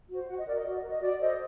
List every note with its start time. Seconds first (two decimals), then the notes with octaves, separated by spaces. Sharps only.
0.10 F#4 C5
0.28 F#4 F#5
0.38 D#5
0.46 A#4 D5
0.56 D#5
0.65 F#4
0.77 D5
0.82 A#4
0.89 D#5
1.01 F#4 D5
1.19 A4 C5 D#5